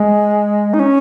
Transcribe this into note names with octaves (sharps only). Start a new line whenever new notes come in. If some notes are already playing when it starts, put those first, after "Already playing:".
Already playing: G#3
D#4
C#4